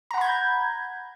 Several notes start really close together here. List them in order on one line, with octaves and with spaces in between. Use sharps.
A#5 F#5 B5 G#6 G6